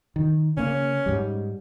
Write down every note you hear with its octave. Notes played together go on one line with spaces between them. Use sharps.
D#3
C#3 A#3 C#4
G#2 G3